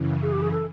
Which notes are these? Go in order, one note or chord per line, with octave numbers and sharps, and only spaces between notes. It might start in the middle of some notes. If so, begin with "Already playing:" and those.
Already playing: F#2 C#3 E3
G#4
G4
G#4
A4